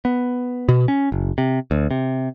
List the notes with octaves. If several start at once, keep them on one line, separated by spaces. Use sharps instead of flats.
B3
B2
C#4
F#1
C3
D2
C3